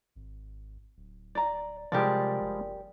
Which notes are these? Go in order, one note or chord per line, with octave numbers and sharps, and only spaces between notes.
G#1
D1
D5 A#5
C3 F3 G3 G#3 G4 A#4 D5
F#1